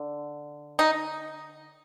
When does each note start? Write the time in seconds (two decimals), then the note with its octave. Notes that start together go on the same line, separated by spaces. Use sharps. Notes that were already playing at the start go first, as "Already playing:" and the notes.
Already playing: D3
0.79 D#4